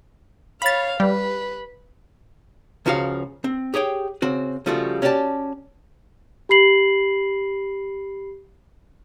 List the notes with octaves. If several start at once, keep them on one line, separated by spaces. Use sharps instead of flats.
C#5 F5 B5 A6
G3 B4
C#2 C#3 F3 F#4 A4 F5
C4
G4 G#4 C#5 G5
C#3 C4 F#4
C#3 F3 G3 A3 F4 F#4
C#4 F#4 G4 A4 D5 A5
G4 B5 C7 F#7